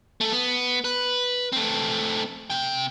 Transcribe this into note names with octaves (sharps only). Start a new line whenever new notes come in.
A3 A4
B3
B4
A3 C4
C3 G5